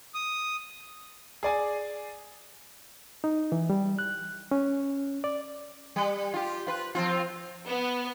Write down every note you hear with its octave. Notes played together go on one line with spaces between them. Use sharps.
D#6
G#4 D5 G#5
D#4
E3
G3
F#6
C#4
D5
G3
F4 G4
F4 B4
F3 C4 F4
B3